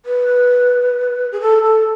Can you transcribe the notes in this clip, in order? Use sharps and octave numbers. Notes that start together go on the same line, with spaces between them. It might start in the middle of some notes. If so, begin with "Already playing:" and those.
B4
G#4
A4
A4